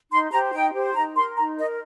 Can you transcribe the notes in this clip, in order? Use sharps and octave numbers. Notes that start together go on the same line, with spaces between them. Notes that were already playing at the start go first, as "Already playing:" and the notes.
D#4 C6
G4 C5 A#5
D#4 G5
G4 C5
D#4 A#5
A#4 C6
D#4 A#5
A#4 D#5